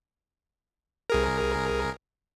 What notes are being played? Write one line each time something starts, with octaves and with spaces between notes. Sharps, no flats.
C2 G#4 A#4